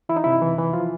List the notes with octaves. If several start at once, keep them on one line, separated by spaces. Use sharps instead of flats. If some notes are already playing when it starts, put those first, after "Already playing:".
E3 E4
D#4
C3 E4
E3
E3
F3 F4